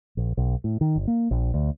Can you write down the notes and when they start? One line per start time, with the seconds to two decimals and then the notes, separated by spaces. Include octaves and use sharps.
0.17 A#1
0.37 B1
0.64 A2
0.81 D#3
0.96 G1
1.07 A#3
1.31 A#1
1.54 D2